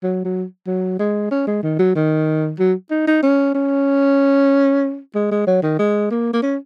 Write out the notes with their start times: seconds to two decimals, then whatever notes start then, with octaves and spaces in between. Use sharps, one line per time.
0.03 F#3
0.25 F#3
0.67 F#3
0.99 G#3
1.31 C#4
1.47 G#3
1.63 D#3
1.79 F#3
1.95 D#3
2.59 F#3
2.91 D#4
3.07 D#4
3.23 C#4
3.55 C#4
5.15 G#3
5.31 G#3
5.47 F#3
5.63 D#3
5.79 G#3
6.11 A#3
6.34 A#3
6.42 C#4